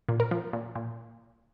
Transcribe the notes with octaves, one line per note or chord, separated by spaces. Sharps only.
A#2
A#4
F3
A#2
A#2